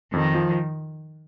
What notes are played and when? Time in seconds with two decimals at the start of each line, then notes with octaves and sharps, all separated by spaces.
0.13 F2 D#3
0.35 F3